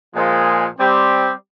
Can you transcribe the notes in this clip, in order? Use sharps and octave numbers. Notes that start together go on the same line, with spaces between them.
A#2 F3 G#3
G3 C4 G4